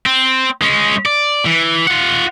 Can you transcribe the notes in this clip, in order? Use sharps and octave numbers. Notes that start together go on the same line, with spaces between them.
C4
G#3 C#4
D5
E3
F4 F#5